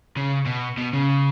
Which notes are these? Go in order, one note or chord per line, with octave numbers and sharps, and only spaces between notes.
C#3
B2
B2
C#3